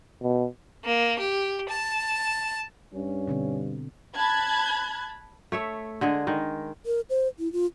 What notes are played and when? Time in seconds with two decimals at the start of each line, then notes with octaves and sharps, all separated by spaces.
0.22 B2
0.84 A#3
1.19 G4
1.70 A5
2.93 G2 C#4
3.28 B2 D3 C4
4.16 A5 B5 F#6 G#6
5.52 A3 C#5 E5
6.01 D3 G#3 G#4
6.27 D#3 G#3
6.86 A#4
7.10 C5
7.39 E4
7.53 F4